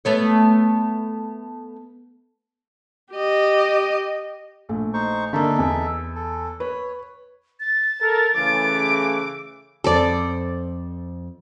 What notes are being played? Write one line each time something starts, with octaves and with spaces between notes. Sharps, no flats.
A3 B3 C#5
G4 D#5
A#1 A3
D#4 C5 C#6
D3 A#3 D#4 A4 E5
E2
A4
B4 C#5
A6
A4 A#4
C#3 E3 A3 D6
F2 A4 C5 D5